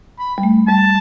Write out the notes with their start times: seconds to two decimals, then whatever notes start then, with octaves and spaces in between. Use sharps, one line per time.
0.19 B5
0.38 G3
0.43 A3
0.68 G3 A5